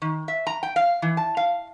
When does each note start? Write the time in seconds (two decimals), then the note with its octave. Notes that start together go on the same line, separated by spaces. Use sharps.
0.02 D#3
0.28 E5
0.47 A#5
0.63 G5
0.76 F5
1.02 E3
1.17 A5
1.37 F5